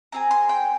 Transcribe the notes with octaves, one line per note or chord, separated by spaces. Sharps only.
C4 F4 G#4 A#5
C6
G5